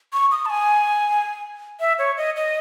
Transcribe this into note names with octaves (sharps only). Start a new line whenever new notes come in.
C#6
D#6
A5
G#5
E5
C#5
D#5
D#5